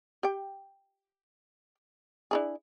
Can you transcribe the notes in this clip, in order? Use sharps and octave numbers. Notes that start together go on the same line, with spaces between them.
G4 G5
D4 E4 G#4